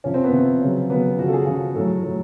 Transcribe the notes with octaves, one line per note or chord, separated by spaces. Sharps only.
C3 F3 C#4
C4
B3
C3 F3
C#3 F#3
C#3 F#3 B3
C#3 F3 F#4
A4
G#4
C#3 F3
A2 F#3 A4
A2 F#3